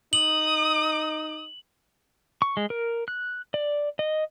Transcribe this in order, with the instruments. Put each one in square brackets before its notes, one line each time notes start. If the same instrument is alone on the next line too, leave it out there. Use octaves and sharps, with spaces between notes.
[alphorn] D#4 [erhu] D#6 [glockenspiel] F#7
[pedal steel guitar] C#6
G#3
A#4
F#6
D5
D#5